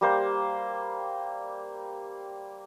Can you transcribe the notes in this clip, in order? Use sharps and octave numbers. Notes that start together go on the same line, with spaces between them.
G3 A#3 C5